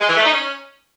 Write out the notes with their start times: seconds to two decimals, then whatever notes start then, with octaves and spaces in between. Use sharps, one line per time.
0.01 G#3
0.09 E3
0.17 A3
0.25 D#4
0.33 C#4